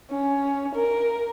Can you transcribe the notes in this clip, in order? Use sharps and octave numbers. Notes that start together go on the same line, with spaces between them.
C#4
A#4